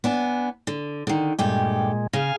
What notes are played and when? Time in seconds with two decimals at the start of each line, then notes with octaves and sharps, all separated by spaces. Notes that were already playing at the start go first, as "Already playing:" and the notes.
0.04 B3 D4 G#5
0.67 D3
1.07 D3 D#3
1.39 G2 A#2 G#3 A3 G4
2.13 C#3 F5 G#5